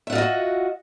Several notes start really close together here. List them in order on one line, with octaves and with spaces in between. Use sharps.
E5 F#5 F4 D#5 F#4